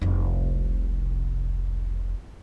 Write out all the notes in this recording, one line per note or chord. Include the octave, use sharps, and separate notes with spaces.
F1 C2